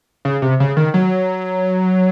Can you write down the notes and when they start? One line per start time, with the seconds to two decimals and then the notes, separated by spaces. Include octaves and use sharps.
0.25 C#3
0.42 C3
0.60 C#3
0.77 D#3
0.94 F#3